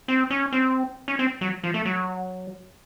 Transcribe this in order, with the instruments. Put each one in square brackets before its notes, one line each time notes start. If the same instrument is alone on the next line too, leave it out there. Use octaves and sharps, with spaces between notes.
[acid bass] C4
C#4
C4
C#4
C4
F#3
F3
A3
F#3